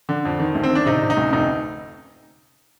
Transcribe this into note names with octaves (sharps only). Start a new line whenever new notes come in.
D3
F2
D#3
D2
C4
D#3 D4
C3 D#4
C3
D#4
D2
F1 D#4